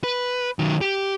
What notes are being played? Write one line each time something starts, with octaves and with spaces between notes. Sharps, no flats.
B4
D#3 F#3
G4